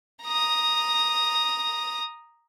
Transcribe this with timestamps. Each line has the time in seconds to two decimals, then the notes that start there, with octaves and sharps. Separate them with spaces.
0.24 A#5 D#6